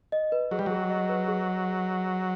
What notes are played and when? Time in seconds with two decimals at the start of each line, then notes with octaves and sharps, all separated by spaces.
0.12 D#5
0.32 B4
0.51 F#3 G#4
0.59 G3
0.66 F#3 G#4
0.90 D#5
1.09 B4
1.28 G#4